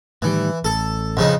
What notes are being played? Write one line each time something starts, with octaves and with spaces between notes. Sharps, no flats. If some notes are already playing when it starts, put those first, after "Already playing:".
A2 D#3 E3 G3
A1 A4
F2 C#3 D#4